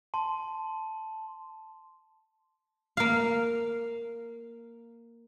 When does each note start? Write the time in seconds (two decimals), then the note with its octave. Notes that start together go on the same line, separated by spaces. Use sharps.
0.14 A5 C6
2.97 A#3 F5